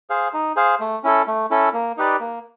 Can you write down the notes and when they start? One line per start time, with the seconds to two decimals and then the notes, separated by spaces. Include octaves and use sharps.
0.10 G#4 C5 F5
0.34 D#4
0.56 G#4 C5 F5
0.80 A3
1.03 C#4 E4 A4
1.27 A3
1.50 C#4 E4 A4
1.73 A#3
1.97 D#4 G4 B4 D5
2.20 A#3